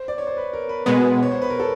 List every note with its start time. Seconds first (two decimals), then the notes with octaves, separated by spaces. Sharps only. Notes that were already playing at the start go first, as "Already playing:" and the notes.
Already playing: C5
0.08 D5
0.18 C#5
0.27 C5
0.37 B4
0.53 A#4
0.69 B4
0.86 B2 G#3 B3
1.23 C#5
1.31 C5
1.42 B4
1.50 A#4
1.60 A4